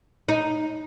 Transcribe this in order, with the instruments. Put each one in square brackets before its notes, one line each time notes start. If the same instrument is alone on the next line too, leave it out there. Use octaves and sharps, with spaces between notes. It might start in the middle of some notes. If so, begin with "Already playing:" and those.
[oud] D#4